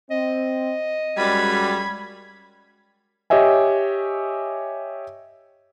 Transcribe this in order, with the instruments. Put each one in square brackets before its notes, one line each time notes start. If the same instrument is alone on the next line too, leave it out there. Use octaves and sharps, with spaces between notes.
[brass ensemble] C4 [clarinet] D#5
[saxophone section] F#2 G3 [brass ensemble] G#3 [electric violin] B5 G#6
[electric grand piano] G4 C#5 D#5 E5 G#5